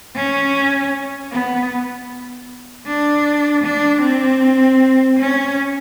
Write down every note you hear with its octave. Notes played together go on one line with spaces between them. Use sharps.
C#4
B3
D4
D4
C4
C#4